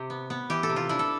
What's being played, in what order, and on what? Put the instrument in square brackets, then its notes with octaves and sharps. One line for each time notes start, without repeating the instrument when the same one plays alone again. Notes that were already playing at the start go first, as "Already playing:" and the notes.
Already playing: [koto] C3 G4
B3
B3
E3 G4
A4
C3
F4
D4 E4
A4